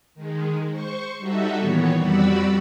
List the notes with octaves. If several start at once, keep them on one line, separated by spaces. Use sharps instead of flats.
D#3 G#3
C5 C#6
G3 D#4 F#4 A4 E5
A#2 D#3 E3 B3 C#5
F2 G3 F#4 D5 B5 E6